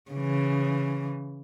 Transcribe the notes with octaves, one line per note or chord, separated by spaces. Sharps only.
C#3 E3